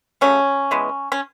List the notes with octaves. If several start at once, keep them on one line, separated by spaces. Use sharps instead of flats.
C#3 F#3 A3 C#4
E3 G#3 B3
C#4